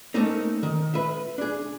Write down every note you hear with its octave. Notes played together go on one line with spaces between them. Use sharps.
A3 A#3 C4 C#4 D#4 A#4
D#3
B4 E5
D4 G#4